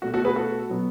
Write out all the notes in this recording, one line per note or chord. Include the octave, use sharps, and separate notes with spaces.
B2 A3 F#4
F#4 A4
G#4 B4
F#4 A4
B2 F#3 B3